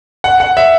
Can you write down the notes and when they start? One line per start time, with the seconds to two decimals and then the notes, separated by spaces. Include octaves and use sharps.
0.24 F#5
0.40 F#5
0.57 E5